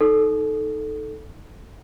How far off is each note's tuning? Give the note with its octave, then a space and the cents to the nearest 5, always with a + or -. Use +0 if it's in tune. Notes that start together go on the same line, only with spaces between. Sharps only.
D#4 +0 A4 -5